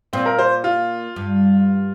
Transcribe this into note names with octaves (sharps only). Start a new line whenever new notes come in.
A#2 C4
A#4
C5
F4
G2